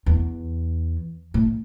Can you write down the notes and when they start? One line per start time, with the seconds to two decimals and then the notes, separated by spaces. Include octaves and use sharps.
0.06 E2
1.34 A2